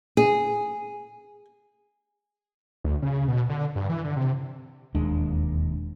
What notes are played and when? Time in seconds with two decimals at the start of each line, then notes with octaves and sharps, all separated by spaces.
0.17 G#4
2.84 D2
3.02 C#3
3.28 B2
3.49 D3
3.76 G2
3.89 E3
4.04 D3
4.16 C3
4.95 E1 D#2 G#3 D4